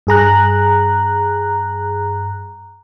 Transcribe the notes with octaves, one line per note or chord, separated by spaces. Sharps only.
G2 G#4 A#5 F#6